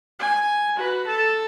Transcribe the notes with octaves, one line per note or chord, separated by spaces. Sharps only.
G#5
F#4 B4
A4 A5